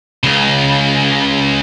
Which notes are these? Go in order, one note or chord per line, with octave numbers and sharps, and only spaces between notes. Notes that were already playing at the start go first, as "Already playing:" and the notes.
C#2 C#3